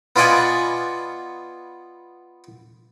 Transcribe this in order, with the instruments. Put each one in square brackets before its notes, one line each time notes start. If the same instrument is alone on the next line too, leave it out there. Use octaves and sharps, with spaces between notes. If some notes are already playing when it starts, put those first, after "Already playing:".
[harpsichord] B3 F4 D5 D#5 F#5 G#5